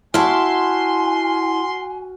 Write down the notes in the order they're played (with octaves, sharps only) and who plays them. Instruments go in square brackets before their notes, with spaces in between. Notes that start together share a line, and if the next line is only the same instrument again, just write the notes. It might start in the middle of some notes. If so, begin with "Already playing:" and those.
[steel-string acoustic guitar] E4 A5 [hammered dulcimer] F#4 F5 [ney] G#5 [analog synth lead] C6